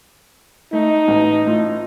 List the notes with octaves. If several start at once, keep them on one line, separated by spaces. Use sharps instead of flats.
A3 D#4
A1
A2 F4